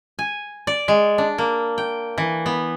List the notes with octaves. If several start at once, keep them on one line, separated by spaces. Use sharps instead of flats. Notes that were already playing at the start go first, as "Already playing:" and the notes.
G#5
D5
G#3
D4
A#3
G5
E3
B3